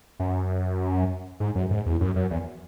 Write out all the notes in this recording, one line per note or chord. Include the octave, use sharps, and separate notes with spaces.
F#2
G#2
F#2
G#2
E2
F#2
F#2
E2